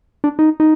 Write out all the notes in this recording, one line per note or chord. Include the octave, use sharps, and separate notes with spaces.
D4
D#4
D#4